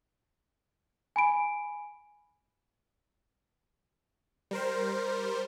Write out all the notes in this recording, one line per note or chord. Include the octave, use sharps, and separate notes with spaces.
G#5 B5 D7
G3 A#4 C5